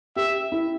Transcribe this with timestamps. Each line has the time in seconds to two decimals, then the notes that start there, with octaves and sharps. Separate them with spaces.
0.16 G4 E5
0.52 E4